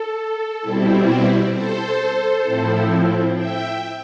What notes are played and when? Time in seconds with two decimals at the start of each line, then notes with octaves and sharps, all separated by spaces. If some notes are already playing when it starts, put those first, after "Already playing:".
Already playing: A4
0.61 B2 G3 C4 E4
1.52 A4 C5
2.43 A2 F3 C4 E4
3.35 E5 G5